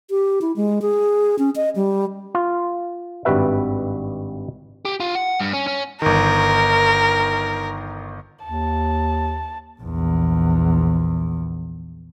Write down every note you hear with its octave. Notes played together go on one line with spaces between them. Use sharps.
G4
E4
G#3
G#4
C#4
D#5
G3
F4
G#1 G2 G3 F#4 B4 E5
G4
F4
F#5
G2
C#4
C#4
G1 D#3 A#4
D#2 A5
A#1 E2